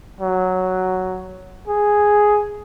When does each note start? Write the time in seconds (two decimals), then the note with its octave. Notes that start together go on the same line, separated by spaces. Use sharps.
0.21 F#3
1.67 G#4